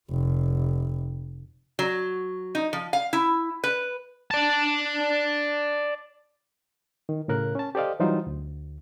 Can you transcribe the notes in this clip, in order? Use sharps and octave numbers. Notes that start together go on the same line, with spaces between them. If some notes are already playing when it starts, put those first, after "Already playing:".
F1
F#3
D#4
F3
F5
E4
B4
D5 A5
D#3
A2 C#3 A#4 F#6
C#4 A5
G4 A4 C5 D5 D#5 F5
E3 F#3 G3 D#4 F4 C5
D2